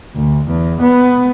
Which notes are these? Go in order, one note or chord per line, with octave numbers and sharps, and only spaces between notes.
D2
E2
B3